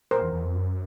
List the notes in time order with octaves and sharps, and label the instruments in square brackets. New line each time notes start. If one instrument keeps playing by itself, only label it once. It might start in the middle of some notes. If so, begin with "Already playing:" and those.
[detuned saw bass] A#2 [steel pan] A#4 C5
[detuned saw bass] E2
E2
F2
F#2